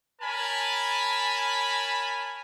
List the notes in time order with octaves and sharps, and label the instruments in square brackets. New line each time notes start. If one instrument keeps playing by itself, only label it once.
[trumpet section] A#4 C#5 G#5 A5 B5